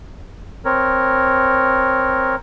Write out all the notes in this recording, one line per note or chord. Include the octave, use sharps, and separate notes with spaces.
C4 A#4 C#5